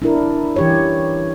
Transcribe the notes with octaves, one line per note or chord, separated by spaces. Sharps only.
D4 E4 A#4
E3 G4 C#5